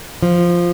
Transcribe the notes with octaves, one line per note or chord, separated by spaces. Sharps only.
F3